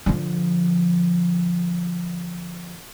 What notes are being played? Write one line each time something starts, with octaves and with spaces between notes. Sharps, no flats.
D3 F3